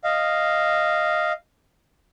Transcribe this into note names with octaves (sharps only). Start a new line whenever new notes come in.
D#5 F5